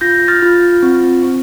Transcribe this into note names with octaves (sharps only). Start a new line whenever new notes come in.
F4 G6 A#6
F6 A6
F4
C4
C4